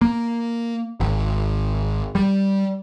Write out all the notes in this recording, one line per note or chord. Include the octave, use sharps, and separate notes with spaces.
A#3
G#1
G3